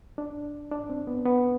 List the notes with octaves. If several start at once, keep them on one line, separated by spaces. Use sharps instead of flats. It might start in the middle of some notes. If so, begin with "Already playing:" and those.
D4
D4
C4
B3
B3